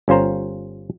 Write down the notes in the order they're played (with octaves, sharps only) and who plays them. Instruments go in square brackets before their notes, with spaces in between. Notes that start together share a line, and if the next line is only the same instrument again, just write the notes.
[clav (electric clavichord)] G1 C#4 F4 C5 A#5